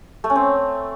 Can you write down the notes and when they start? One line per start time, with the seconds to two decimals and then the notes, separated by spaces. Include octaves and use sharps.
0.24 A3
0.30 C#4
0.36 C4